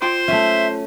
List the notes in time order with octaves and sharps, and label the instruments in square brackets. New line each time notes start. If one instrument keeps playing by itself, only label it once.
[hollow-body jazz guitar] F4 G5 C6 [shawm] C5
[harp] A3 C#4 [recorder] E5